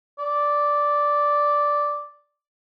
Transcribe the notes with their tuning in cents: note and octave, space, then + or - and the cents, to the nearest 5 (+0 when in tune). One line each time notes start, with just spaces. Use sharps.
D5 -5